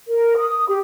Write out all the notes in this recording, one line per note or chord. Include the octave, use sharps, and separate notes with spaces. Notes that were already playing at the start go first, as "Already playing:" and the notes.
A#4
D#6
G4